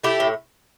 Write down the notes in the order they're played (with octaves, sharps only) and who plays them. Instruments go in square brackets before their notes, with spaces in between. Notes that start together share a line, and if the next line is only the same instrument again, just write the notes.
[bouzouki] A3 E4 G4
A2